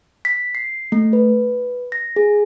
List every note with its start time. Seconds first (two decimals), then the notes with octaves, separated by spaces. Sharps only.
0.25 B6
0.55 C7
0.92 A3
1.13 B4
1.92 A#6
2.16 G#4